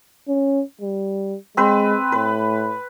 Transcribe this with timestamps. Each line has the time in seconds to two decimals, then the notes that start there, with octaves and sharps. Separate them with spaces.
0.28 C#4
0.81 G3
1.57 G#3 C4 B4
2.12 A2 B4